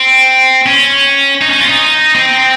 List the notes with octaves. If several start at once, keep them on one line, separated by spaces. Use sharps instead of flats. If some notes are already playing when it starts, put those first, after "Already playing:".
Already playing: C4
C#4
D#4
C#4
F4
D#4
C4